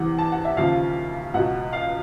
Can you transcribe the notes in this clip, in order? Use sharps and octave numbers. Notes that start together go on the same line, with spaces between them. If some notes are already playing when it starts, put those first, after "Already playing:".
Already playing: E2 C3 E3 F#5
A5
F#5
E5
D#2 C#3 F3 F5
C#2 B2 F#5
F5